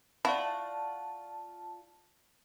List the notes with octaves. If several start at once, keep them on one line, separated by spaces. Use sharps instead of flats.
E4 F4 D5 F#5 A5 C#6 A#6